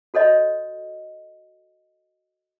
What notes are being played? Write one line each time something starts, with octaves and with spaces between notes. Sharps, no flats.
F#4 A4 C#5 D#5